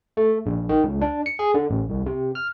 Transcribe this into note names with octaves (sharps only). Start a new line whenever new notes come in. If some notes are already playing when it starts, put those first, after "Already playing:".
A3
A#1
D#3
C#2
D4
C#7
G#4
D3
A1
C2
C3
F6